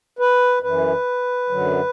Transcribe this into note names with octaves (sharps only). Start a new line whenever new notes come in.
B4
F#2 E3 B4
F#2 D3 F#3